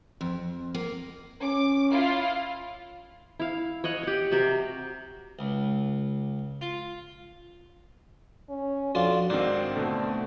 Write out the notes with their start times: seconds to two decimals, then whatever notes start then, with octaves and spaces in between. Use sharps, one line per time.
0.21 F2
0.74 A#3
1.42 C#4 D6
1.91 E4 F4 F5
3.40 E4 F5
3.84 C#5 D#5 F#5 G#5
4.03 G4 F#5
4.32 C3 F#4 G4 A#4
5.39 C#2
6.61 F4
8.50 C#4
8.95 F2 D4 F4 F#4
9.30 G#2 D#3 C4 D4 D#4
9.75 B2 D3 A3 C4